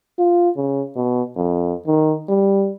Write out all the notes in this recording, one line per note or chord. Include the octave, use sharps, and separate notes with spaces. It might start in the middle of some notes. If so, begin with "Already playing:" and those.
F4
C#3
B2
F2
D#3
G3